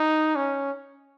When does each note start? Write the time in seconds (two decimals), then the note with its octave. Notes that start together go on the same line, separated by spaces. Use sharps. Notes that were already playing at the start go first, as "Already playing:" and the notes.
Already playing: D#4
0.36 C#4